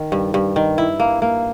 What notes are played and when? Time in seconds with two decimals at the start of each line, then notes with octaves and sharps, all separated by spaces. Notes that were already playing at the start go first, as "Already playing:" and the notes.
Already playing: D#3
0.12 G2
0.34 G2
0.56 D#3
0.78 E4
1.00 A#3
1.22 A#3